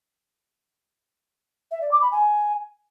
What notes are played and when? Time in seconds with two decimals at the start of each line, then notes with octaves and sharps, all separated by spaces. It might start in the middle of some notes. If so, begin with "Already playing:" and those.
1.71 E5
1.81 D5
1.91 D6
2.01 B5
2.11 G#5